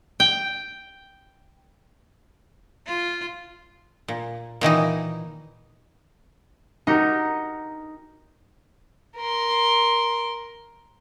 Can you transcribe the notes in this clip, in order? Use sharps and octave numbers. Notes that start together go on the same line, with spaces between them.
G5
F4
A#2
A#2 D#3 E3 D#4
D#4 F#4 G4 A#4
A#4 C6